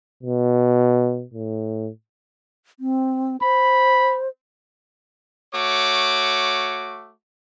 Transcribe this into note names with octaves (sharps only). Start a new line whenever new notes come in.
B2
A2
C4
C5 B5
A3 F#4 C#5 D6